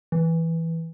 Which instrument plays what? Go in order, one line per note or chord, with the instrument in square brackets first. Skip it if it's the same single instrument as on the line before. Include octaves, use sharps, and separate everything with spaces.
[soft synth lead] E3